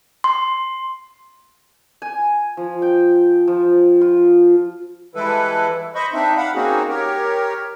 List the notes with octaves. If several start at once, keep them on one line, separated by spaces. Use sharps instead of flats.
C6
G#5
F3
G5
F3
F4
E3 G3 G#3 E4 A4 B4
C5 D#5 B5 C#6
C4 D4 D#4 E5
F5 F#5 B5
A#3 C4 C#4 D#4 F#4 G#4
G4 A#4 C#5